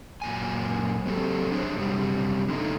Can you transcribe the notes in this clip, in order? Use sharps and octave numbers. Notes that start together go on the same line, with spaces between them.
F#2 A#2 G#5
F#3 C4 G4 A4
D4 G#4 C5 C#5
F#2 C3 G3
D3 A3 D#4